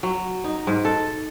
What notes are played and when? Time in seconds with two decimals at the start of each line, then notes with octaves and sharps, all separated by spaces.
0.03 F#3
0.44 D#4
0.67 G#2
0.85 A4